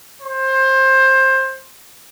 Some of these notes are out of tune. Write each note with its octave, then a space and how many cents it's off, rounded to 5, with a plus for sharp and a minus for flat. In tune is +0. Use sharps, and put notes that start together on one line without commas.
C5 +20